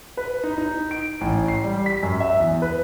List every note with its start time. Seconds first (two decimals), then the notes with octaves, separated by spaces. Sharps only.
0.17 B4
0.44 D#4
0.58 D#4
0.91 D7
1.21 A1
1.48 C7
1.64 G3
1.86 B6
2.03 F#2
2.20 E5
2.40 E2
2.62 B4